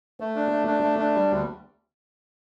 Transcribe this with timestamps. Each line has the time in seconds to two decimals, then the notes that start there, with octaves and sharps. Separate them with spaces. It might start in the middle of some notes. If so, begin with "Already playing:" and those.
0.20 A3
0.36 D4
0.51 A3
0.68 D4
0.83 A3
0.99 D4
1.15 G3
1.31 D2